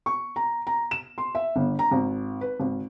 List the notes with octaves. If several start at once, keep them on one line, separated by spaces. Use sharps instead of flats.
C#6
A#5
A#5
E7
C6
E5
G1
A#5
G#1
B4
G#1